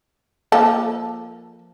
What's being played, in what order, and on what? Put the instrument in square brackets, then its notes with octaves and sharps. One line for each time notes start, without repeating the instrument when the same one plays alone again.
[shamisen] F3 A#3 A4